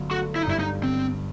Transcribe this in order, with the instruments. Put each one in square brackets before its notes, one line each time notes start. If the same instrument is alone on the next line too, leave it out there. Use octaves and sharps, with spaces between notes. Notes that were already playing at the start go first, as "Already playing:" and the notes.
Already playing: [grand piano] G1 F#3
[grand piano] A3 [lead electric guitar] F#4
[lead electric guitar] E4
D#4
[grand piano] G2 [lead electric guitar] E4
[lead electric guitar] D#4
[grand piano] G1 [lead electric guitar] C4